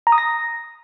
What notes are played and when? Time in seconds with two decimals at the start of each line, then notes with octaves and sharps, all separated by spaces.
0.07 A#5
0.12 D#6
0.18 A#6